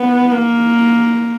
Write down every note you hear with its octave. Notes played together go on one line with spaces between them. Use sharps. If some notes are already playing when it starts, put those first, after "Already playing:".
Already playing: B3
A#3